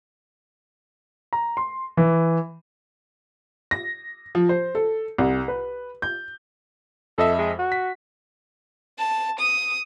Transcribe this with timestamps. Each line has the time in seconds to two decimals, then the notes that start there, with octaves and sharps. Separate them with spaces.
1.33 A#5
1.57 C6
1.97 E3
3.71 A#6
4.35 F3
4.49 C5
4.75 A4
5.18 C2
5.48 B4
6.02 G6
7.18 F2 A4 D#5 E5
7.38 G#3
7.59 F#4
7.72 B6
8.99 A5
9.40 D#6